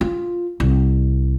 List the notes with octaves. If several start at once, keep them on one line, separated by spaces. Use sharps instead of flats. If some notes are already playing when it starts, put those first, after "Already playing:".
F4
C2